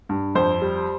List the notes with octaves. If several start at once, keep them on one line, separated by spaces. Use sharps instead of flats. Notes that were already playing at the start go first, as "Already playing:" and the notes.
G2
F2 C5
G3